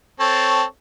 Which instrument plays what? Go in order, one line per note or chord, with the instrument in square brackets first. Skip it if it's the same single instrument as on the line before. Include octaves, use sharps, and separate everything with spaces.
[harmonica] C4 A4 C#5